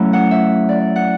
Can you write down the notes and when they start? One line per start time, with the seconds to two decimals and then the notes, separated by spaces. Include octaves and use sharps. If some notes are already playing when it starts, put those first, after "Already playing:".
Already playing: F#3 A3 C#4 E4
0.13 F#5
0.31 E5
0.69 D5
0.96 F#5